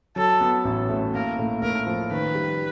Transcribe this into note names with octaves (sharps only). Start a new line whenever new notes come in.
F#3 A4
B3
A1
A2
A#3 A#4
A2
A2 A#4
F3
D#3 B4
G3